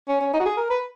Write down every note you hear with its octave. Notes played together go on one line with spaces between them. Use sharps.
C#4
C#4
D#4
F#4
G#4
A#4
B4